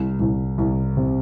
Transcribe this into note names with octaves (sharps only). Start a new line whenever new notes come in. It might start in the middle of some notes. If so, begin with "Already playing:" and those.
Already playing: C2
C2
C2
C3